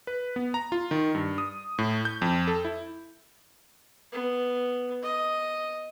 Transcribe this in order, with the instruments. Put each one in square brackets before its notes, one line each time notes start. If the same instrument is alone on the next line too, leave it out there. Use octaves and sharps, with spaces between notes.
[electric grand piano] B4
B3
A#5
F4
D#3
G2
D#6
A2
G6
F2
A4
E4
[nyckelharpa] B3
D#5